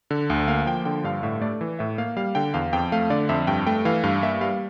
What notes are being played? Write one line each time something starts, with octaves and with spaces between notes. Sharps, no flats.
D3
D2
A#3 F5
F3 G5
D3 G5
G2 F5
A2 E5
A3 D5
E3
A2 E5
A#3 F5
G3 F5
D3 G5
E2 F5
F2 G5
A3 F5
D3 D5
F2 E5
G2 G5
A3 G5
E3 F5
G2 F5
A#3 E5
G3 F5